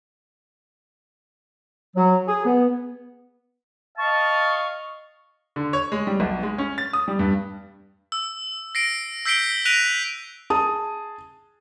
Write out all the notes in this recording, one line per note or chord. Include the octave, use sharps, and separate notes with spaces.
F#3
G#4
B3
D#5 F5 A5 C#6
D3
C#5
G#3
G3
B1
G#3
C#4
A6
D#6
G3
G2
E6
A#6 C7 D7
E6 G6 B6 C7 D7 G7
F#6 A#6 B6 D7 D#7 F7
G#4 A5 D#6